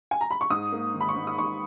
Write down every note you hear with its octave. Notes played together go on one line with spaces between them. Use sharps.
G#5
A#5
B5
C#6
G#2 D#6
A#3
D#3
B5
C#6
G#2
D#6
G#2 C#6